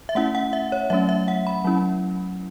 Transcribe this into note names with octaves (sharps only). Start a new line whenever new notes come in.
E5
A3 C#4 E4 F#5
F#5
E5
C#5
F#3 A3 C#4 E5
E5
F#5
B5
F#3 C#4 E4